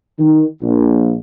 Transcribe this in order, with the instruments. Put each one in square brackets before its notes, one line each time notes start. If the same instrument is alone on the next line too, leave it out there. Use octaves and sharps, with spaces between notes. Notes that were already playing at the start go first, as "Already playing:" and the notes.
[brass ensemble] D#3
A#1